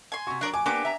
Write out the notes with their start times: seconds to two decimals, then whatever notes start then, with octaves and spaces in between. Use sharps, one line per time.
0.12 G#5 C6
0.27 C3 F#4 C#6
0.41 F#3 D4 A#4 D5
0.54 G#5 D6
0.66 A#3 B3 D4 G4 D6
0.85 E5 A#5